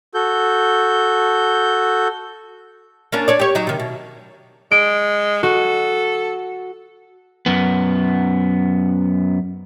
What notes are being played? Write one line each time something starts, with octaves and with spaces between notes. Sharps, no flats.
F#4 A4 G6
A#3 C#4 D4
D4 C#5 D5
G4 C#5
F#3 D#4
C3 D#3
B2
G#3 D7
F#4 A4
F#2 B3